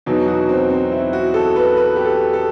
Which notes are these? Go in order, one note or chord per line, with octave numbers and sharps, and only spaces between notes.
E2 B2 F#3 D#4
F#4
C4
C4
E4
F#4
A4
B4
B4
G4
A4
A4